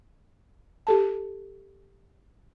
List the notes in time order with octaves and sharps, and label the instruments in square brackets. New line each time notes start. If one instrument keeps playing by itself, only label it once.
[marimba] G4 A4 A5